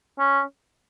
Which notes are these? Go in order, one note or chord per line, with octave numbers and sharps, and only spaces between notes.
C#4